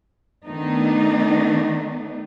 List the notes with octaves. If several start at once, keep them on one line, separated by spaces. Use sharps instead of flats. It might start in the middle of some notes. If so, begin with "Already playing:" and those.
D#3 A3 B3 D4 D#4